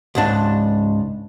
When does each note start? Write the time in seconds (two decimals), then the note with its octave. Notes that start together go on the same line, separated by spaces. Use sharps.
0.15 C#2 G#2 D4